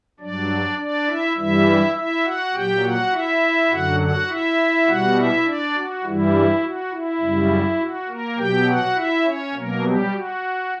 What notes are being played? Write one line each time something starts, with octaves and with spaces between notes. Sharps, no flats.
G2 F#3 D4 D5
D4 D5
E4 E5
G2 E3 G3 E4 E5
E4 E5
F#4 F#5
A#2 F#3 G4 G5
F#4 F#5
E4 E5
F#2 D3 F#3 F#4 F#5
F#4 F#5
E4 E5
B2 G3 F#4 F#5
E4 E5
D4 D5
F#4
G2 E3 G3 E4
F#4
E4
F#2 C#3 G3
F#4
A#3 A#4
B2 F#3 G4 G5
F#4 F#5
E4 E5
C#4 C#5
B2 F#3 A#3 A#4
G3 G4
F#4